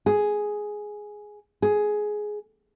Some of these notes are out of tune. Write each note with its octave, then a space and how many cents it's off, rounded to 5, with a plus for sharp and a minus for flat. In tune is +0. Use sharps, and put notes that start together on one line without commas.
G#4 +5
G#4 +10